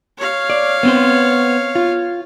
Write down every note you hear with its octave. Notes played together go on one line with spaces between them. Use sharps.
C#5 F5
D5
B3 C4 C5
F4